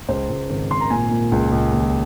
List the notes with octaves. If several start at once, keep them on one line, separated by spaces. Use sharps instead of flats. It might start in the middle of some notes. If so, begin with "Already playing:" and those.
C#2 C5
C#2
G#1
G#1 C6
A#5
A#2 G#5
A#2
C#2
C#2
D#2